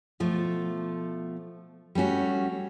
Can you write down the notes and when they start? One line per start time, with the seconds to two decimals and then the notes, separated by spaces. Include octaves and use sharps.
0.20 B2 F3 A3
1.95 G3 A3 C#4 F#4